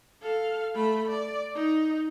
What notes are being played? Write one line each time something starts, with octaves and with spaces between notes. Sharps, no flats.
A4 F5
A3 B5
D5
D#4